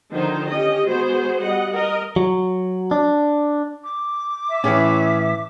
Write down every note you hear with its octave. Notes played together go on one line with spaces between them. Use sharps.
D3 D#3 F3 D#4 C5
C#4 G4 D#5
G#3 B3 F#4 G#4 C5
G3 D#5 F#5
A#4 D#5
F#3
D4
D6
E5
A2 E3 C#4 G#4 C#5